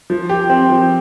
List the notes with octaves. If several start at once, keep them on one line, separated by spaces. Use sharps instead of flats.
F3
G4
C4
F3